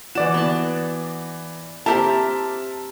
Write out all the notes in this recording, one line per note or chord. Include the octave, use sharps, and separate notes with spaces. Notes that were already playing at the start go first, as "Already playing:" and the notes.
E3 F#4 D5 E7
B3 A5
C4 G4 A#4 E5 A5